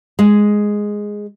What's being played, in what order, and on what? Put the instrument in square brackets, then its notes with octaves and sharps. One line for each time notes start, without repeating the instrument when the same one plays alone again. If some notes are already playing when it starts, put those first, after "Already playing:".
[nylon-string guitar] G#3